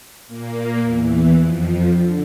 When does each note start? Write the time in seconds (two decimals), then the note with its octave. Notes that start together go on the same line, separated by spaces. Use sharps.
0.27 A#2 A#3
0.82 E2 E3
1.37 F2 F3
1.91 D3